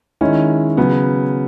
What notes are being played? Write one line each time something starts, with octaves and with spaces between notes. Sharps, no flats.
D#3 G#3 C#4 E4
C#3 F#3 B3